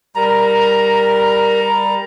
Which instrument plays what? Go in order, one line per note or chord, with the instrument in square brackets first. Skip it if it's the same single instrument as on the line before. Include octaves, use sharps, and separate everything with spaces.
[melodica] G3 A#5 [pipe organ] A#4